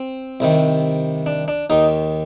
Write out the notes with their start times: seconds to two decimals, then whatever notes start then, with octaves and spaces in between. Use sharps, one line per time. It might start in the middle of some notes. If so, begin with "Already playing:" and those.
Already playing: C4
0.40 C2 C3 D#3
1.26 D4
1.48 D4
1.70 D#2 D#3 D#4